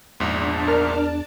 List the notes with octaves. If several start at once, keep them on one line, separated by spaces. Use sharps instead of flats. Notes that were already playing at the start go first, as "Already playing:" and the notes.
A#1 E2 G#2 D4 D5 A5
A#4 F6